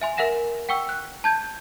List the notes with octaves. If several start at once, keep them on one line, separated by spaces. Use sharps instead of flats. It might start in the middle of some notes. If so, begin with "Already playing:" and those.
E5 G#5 C6
A#4 E5 F#5 A#6 E7
F#5 G5 C#6 E6
F#6
A5 G6 G#6